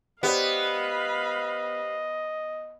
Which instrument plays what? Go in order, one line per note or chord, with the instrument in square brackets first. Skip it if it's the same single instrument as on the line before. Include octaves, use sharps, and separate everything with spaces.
[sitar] B3 [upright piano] G4 C5 D5 [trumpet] D#5 [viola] F5 B5